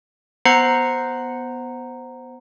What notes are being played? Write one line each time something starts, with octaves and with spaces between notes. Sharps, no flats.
B3 C5 F#5 A#5 C7 C#7